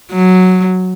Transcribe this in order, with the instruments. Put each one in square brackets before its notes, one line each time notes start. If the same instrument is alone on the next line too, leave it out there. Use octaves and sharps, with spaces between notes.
[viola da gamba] F#3